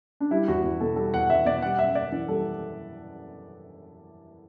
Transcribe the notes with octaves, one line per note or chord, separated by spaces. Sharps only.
D4
G3 E4
E2 F#4
E2
B2 A4
G3 A4
E2 F#5
E2 E5
B2 D5
G3 F#5
F#2 E5
F#2 D5
E3
G3 A4